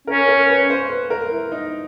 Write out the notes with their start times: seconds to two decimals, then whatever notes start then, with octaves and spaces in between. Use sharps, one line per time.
0.07 C#4 A#4
0.28 A#4
0.49 B4
0.70 C5
0.90 B4
1.10 A#4
1.31 E4
1.52 D#4